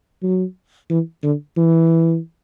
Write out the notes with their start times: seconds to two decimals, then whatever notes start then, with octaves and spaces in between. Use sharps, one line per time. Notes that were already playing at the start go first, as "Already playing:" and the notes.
0.23 F#3
0.90 E3
1.23 D3
1.57 E3